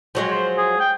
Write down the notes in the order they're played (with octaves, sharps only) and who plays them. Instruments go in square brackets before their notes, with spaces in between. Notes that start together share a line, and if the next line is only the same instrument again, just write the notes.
[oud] F3 F#3 G#3
[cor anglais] C5
G#4
G5